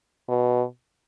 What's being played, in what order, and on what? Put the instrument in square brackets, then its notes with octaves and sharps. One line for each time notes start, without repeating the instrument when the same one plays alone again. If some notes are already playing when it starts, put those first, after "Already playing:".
[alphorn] B2